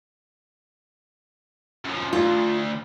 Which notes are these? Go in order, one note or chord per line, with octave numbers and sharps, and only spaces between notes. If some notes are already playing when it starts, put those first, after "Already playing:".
F#2 F3
D2 F4